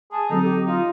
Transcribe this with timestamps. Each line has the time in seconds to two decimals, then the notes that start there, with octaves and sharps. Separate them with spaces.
0.12 G#4 A5
0.30 D3 F#3 C4 D#4 A4
0.44 G4
0.66 D#4 F4